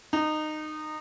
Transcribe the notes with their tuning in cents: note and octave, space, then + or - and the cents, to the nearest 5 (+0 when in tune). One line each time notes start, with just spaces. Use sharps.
D#4 -20